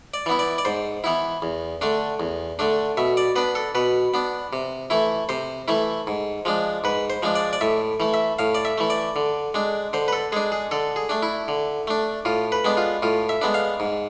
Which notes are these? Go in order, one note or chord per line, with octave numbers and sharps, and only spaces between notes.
D5
E3 B3 E4
D5
D5
G#2 C5
E3 B3 E4
E2
D3 A3 D4
E2
D3 A3 D4
B2 E5
D5
B3 D4 B4
A4
B2 B4
B3 D4
C3
E3 A3 E4
C3 C5
E3 A3 E4
G#2
F3 G#3 D4
G#2 B4
C5
F3 G#3 D4
D5
D5
A2 E5
E3 A3
E5
A2 F5
D5
E5
E3 A3
D5
D3
G#3 D4
D3 C5
B4
A4
G#3 D4 G#4
G#4
D3 A4
G#4
A3 D4
E4
D3
A3 D4
A2 F4
B4
G#3 B3 D4
F4
A2 F4
E5
G#3 B3 D4
F5
G#2